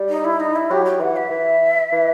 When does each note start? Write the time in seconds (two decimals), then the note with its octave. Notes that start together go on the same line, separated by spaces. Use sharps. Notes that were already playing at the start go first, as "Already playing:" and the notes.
Already playing: G3
0.09 D#4
0.24 E4
0.40 D#4
0.55 E4
0.70 F#3 G4
0.85 G4
1.00 E3 F#5
1.16 E5
1.30 E3
1.92 E3